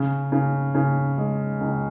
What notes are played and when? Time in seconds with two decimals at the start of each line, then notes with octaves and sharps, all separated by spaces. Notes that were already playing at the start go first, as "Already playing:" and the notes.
Already playing: C#3
0.32 C#3
0.75 C#3
1.18 G#3
1.61 C#2